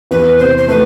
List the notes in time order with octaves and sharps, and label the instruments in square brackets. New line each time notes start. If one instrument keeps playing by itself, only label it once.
[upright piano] E2 [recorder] B4
[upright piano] C3 [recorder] C5
[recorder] C5
[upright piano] A3 [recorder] B4